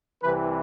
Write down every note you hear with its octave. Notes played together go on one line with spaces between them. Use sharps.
C2 C3 E3 B4